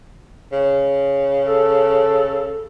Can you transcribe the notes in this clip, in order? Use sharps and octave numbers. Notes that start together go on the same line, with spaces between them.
C#3
A4